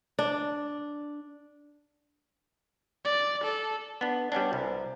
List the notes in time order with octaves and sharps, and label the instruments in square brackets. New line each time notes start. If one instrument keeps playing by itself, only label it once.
[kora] D4
[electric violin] D5
A4
[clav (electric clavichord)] B3 D4
G3 B3 C#4 D4
C2